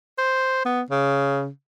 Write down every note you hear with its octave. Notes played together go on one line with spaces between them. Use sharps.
C5
B3
C#3